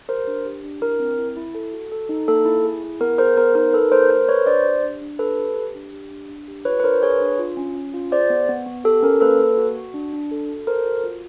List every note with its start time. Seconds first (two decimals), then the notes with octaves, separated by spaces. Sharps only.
0.08 G4 A#4 C5
0.27 D4
0.46 G4
0.64 D4
0.82 E4 A#4
1.00 C4
1.18 E4
1.37 E4
1.55 A4
1.73 F#4
1.92 A4
2.09 D#4
2.28 A#3 A4
2.45 E4
2.64 G#4
2.83 E4
3.00 B3 A#4
3.18 G#4 A#4 C5
3.37 B3 A#4 C5
3.55 D#4 A#4
3.73 D#4 A4 B4
3.92 A#3 A#4 C5
4.10 G#4 A#4 C5
4.28 G#4 B4 C#5
4.46 D4 C5 D5
4.64 G4
4.83 D4
5.01 D4
5.19 G4 A4 B4
5.37 G4
5.57 G4
5.75 D4
5.93 G4
6.11 D4
6.29 D4
6.48 G4
6.65 F4 B4 C#5
6.80 B4
6.84 D4 A#4 C5
7.02 G#4 B4 C#5
7.21 D4
7.39 F4
7.57 C#4
7.76 C#4
7.94 F4
8.12 G#4 C5 D5
8.30 B3
8.49 B3
8.66 B3
8.84 G4 A4
9.03 C#4 A#4
9.21 A#3 A4 B4
9.39 A#3
9.57 F#4
9.76 F#4
9.94 D4
10.13 D4
10.31 A4
10.49 F#4
10.67 A4 A#4 C5
10.86 F#4
11.04 F4